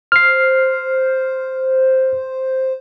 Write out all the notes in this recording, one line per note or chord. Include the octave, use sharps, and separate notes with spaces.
C5 F6 C7